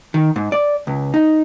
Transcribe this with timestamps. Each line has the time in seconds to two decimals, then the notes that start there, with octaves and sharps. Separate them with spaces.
0.14 D#3
0.36 G#2
0.52 D5
0.87 C#2
1.14 D#4